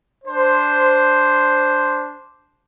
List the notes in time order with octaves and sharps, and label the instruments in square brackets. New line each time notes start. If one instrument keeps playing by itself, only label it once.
[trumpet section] D4 C5